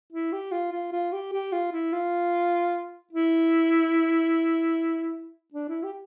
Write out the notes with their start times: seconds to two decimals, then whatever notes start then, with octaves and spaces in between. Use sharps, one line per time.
0.12 E4
0.33 G4
0.52 F4
0.72 F4
0.92 F4
1.13 G4
1.33 G4
1.52 F4
1.72 E4
1.93 F4
3.13 E4
5.54 D4
5.69 E4
5.83 G4